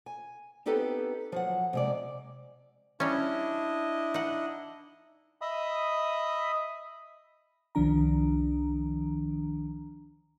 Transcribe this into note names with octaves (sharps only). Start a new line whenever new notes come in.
G#5
B3 C4 D#4 G4 A4 B4
F3 F#3 F#5
C3 G#3 D5
G3 C#4 D4 E4 D#5
D#4 F#5
D#5 E5 B5 D#6
C2 D#3 F3 D4 A#5